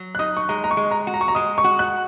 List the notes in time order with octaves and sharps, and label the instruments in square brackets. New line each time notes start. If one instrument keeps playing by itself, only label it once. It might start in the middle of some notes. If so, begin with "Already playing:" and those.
Already playing: [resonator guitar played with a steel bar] F#3
[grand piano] F#6
[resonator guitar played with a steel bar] D#4 [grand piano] D#6
[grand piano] C#6
[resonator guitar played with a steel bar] G#3 [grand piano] A#5
[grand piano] A#5
C#6
[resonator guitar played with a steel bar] G#3
[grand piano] A#5
[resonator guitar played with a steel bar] F#4
[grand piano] A#5
C#6
A#5
[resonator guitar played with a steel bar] G#3 [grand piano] D#6
[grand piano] C#6
[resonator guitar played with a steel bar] F#4
[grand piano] F#6